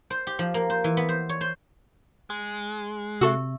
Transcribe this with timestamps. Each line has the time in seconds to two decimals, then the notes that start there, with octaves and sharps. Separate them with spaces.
0.10 C5
0.27 G4
0.39 F3
0.54 A#3
0.70 C5
0.84 E3
0.97 B3
1.09 C5
1.29 C#5
1.41 C5
2.30 G#3
3.21 C3 F#4 A4 E5 C#6 E6